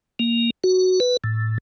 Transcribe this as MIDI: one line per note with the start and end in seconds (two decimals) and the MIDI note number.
0.19 0.50 58
0.64 1.00 66
1.00 1.17 71
1.24 1.58 45